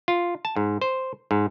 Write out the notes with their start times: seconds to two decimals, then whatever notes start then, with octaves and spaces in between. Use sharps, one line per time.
0.08 F4
0.45 A5
0.56 G#2
0.82 C5
1.31 G#2